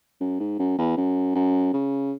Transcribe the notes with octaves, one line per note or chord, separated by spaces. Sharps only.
F#2
G#2
F#2
E2
F#2
F#2
C#3